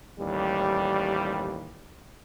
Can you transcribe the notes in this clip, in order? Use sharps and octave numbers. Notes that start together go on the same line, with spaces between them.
A1 D#2 G3